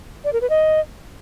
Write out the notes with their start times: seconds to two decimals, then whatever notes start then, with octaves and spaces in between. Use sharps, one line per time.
0.24 D5
0.33 A#4
0.41 B4
0.50 D#5